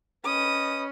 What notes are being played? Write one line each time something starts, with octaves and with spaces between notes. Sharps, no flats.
C#4 B4 D#5 B5 D#6